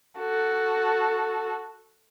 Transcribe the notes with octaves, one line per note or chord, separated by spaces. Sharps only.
F#4 A4